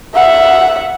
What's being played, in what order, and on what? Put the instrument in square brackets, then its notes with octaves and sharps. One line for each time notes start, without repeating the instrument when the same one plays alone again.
[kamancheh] E5 F#5